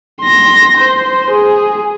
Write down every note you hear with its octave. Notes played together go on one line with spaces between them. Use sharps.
C6 A#6
C5
G#4